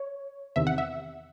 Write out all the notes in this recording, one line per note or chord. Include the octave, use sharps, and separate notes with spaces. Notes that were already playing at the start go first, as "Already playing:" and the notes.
Already playing: C#5
E2 C3 D#3 E5
F#5
E5